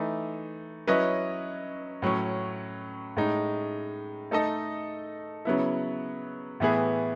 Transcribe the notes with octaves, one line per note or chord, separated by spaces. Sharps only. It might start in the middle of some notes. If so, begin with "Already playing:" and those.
Already playing: E3 A3 D#4
F#3 C#4 E4 B4 D#5
A2 F#3 C#4
A2 G#3 D#4
A3 D#4 A4 D#5
C#3 F#3 B3 E4
A2 E3 B3 E4 G#4